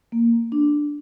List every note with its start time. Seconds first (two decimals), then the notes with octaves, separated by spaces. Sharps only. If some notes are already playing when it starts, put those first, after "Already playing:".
0.12 A#3
0.52 D4